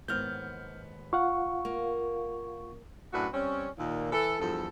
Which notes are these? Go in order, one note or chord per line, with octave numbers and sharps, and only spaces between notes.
D#2 G#2 B3 F6 G6
F4 F5 F#5 C#6
A#3
F#2 A2 D4 F#4 B4
G3 C4 C#4
D#2 A#2
E3 A4
E2 G2 F3 A4